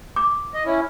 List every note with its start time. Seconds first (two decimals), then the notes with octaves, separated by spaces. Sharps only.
0.16 D6
0.54 D#5
0.65 C#4 E4